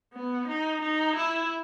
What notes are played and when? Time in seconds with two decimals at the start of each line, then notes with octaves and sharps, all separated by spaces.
0.13 B3
0.48 D#4
0.82 D#4
1.16 E4